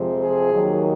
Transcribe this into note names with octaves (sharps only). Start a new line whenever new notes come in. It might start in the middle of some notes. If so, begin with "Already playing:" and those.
Already playing: F2 C3 F3 G#3
G#4
D#2 D#3 F#3